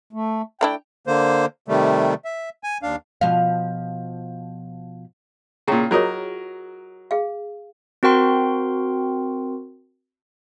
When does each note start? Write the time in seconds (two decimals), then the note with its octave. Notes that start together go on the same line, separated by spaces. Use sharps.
0.13 A3
0.61 A3 D4 E4 G5
1.07 D3 A#3 C5
1.68 C3 D#3 G3 A3
2.25 E5
2.64 G#5
2.83 D#2 D4 F5
3.21 B2 F3 F5
5.68 A#2 C#3 E4 G5 A#5
5.91 F#3 F4 G#4 A#4 C#5 D#5
7.11 G#4 F5
8.03 C4 F#4 A#4 G5 C6